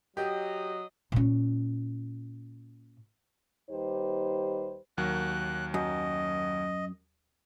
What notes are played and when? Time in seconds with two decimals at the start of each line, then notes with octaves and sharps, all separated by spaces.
0.17 F#3 G4 D#5
1.12 A#2 C#4
3.70 D#2 G3 D#4 G4 B4 C5
4.98 D#2 F#3 A#4 F#6
5.74 F#2 D#5